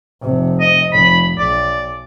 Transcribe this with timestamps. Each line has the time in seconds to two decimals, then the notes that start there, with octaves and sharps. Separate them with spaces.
0.22 F1 C3
0.60 D#5
0.93 F1 B5
1.38 B1 D5